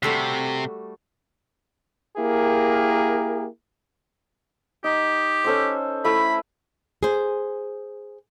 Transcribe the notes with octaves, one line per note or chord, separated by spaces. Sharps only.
C3 G3 A3 F#4
A#3 E4 G4 G#4 A#4
D#4 G4
C#4 A4 C5
A3 E4 B5
G#4 C5